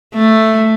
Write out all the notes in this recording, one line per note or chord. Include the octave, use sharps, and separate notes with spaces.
A3